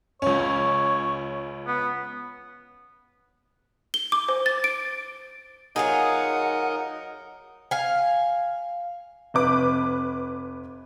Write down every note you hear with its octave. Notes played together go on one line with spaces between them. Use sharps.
C#2 C#4 C#5
B3
G7
D6
C5
A6
D7
F#3 D#4 F4 G#4 A#4 D#5 F#5
F5 G#5
F1 B4 D6